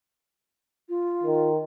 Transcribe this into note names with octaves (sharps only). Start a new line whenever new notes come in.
F4
D#3